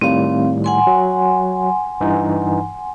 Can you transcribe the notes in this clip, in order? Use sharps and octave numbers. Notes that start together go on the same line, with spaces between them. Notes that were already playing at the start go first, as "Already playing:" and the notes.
A2 D#3 G3 C4 F5
F#5 G#5 C6
F#3
G2 E3 D#4